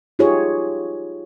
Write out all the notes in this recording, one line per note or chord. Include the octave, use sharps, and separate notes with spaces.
D#4 F4 G4 G#4 C#5